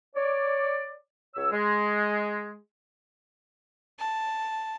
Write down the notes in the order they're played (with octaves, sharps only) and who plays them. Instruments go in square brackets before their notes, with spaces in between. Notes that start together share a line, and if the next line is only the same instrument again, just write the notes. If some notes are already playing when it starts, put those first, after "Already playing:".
[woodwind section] C#5 D5
C#2 C#5 E6
G#3
[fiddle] A5